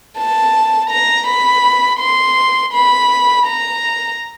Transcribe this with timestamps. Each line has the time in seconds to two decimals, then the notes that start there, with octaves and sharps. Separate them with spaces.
0.18 A5
0.90 A#5
1.27 B5
2.00 C6
2.73 B5
3.46 A#5